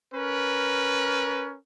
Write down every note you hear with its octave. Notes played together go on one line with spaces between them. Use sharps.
C#4 A#4 B4